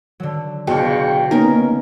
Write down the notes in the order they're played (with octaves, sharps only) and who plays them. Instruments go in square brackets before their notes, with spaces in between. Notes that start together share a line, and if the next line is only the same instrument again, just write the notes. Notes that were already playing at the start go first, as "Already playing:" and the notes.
[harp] D3 F#3
[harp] F#1 F4 [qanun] B2 [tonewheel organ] G#4 C#6 [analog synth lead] G5
[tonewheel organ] A#3 B3 [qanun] C#4 A#4 [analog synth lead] D#4